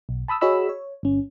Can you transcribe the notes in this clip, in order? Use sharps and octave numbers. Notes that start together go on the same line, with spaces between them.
B1
A5 B5 D#6 E6
F#4 G#4 C#5 D#5 B5 E6
C#5
G1 C#4